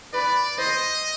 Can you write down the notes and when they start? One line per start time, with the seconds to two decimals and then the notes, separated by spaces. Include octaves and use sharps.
0.13 B4 D5
0.58 C5 D#5